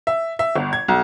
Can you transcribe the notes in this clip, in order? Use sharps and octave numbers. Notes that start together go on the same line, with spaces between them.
E5
E5
G1
G#6
B1